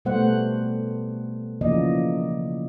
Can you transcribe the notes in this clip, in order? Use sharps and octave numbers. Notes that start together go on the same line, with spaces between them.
B2 G3 A3 B3 C5 F#5
C#3 E3 F3 A#3 D5 D#5